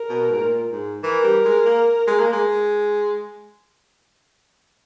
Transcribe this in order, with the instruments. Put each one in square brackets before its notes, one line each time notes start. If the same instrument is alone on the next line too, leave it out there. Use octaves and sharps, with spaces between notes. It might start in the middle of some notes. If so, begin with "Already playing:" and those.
Already playing: [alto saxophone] A#4
[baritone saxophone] B2
G#2
A#2
G#2
[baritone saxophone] E3 [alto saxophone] A#4
[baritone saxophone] G3
G#3
A#3
G#3
A#3
G#3